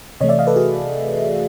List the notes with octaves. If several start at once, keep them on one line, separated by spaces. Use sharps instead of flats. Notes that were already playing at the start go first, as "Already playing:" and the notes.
C3 E3 A3 C#5 D#5
D5 E5
D#5 F5
A4 B4
F#4 G#4